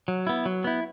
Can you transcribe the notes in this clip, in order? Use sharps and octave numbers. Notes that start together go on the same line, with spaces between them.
F#3
B3 E4
F#3
B3 E4